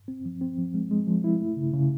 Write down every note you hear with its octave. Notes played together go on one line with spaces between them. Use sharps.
C4
F3
C4
F3
G#3
G#3
F3
E4
A3
C#3
C#3